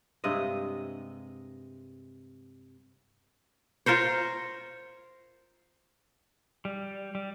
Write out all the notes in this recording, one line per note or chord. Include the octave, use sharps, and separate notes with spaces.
G2 C3 G#3 D#5
F4 A#4 C5 C#5
G3
G3